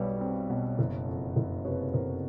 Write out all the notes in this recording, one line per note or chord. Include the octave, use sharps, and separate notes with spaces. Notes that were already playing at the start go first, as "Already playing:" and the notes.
Already playing: B1 B2 G3 B4 C#5
C4
B2
F#1
F2
F#1
C3 B4 C#5
F#1 A#4 C5